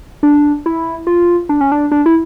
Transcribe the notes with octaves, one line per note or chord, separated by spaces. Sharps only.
D4
E4
F4
D4
C#4
D4
D4
E4